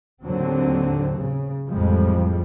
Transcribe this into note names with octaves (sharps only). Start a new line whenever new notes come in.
D#2 A2 D3 F#3 C4
C#3
A1 F2 A2 F3 G3 G#3